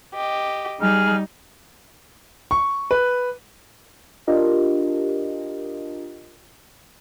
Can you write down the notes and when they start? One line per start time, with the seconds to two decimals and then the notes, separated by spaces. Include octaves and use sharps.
0.15 G4 D#5
0.80 G3 D#4 G#4 F6
2.51 C#6
2.91 B4
4.27 D4 F4 G4 A#4 D#5